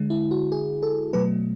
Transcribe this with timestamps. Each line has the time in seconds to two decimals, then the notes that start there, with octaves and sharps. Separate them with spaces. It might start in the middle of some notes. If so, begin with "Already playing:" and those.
Already playing: D3 G#3
0.10 E4
0.31 F#4
0.52 G#4
0.83 A4
1.13 B2 F#3 A3 B4